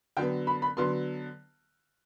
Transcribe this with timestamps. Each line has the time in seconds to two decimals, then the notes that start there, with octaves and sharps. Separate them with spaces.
0.17 D3 F#3 B3 G5
0.47 B5
0.62 B5
0.77 D3 F#3 B3 C6